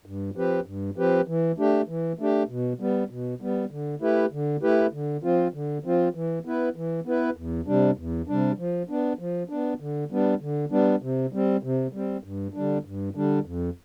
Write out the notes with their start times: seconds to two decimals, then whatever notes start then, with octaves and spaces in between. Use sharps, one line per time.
0.06 G2
0.35 F3 C4 G4 B4
0.66 G2
0.96 F3 C4 G4 B4
1.27 E3
1.58 A3 D4 G4
1.88 E3
2.19 A3 D4 G4
2.49 B2
2.80 G3 B3
3.10 B2
3.41 G3 B3
3.71 D3
4.01 A3 E4 G4 B4
4.32 D3
4.63 A3 E4 G4 B4
4.93 D3
5.23 F3 C4 F4
5.54 D3
5.84 F3 C4 F4
6.15 E3
6.45 B3 E4 B4
6.76 E3
7.05 B3 E4 B4
7.36 E2
7.66 C3 G3 D4
7.97 E2
8.28 C3 G3 D4
8.58 F3
8.89 B3 D4
9.19 F3
9.49 B3 D4
9.80 D3
10.11 G3 B3 D4
10.41 D3
10.71 G3 B3 D4
11.02 C3
11.32 G3 C4
11.63 C3
11.93 G3 C4
12.23 G2
12.54 D3 G3 D4
12.85 G2
13.15 D3 G3 D4
13.45 F2